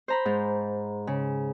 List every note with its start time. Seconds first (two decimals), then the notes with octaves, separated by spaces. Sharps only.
0.08 C5 A#5 B5
0.25 G#2
1.07 C#3